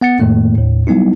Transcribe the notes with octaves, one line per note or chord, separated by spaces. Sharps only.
B3 F#5 A6 C#7
F2 A2 D#3 A3 A#3
D#2 A2
F#3 G3 B3 D#4 E4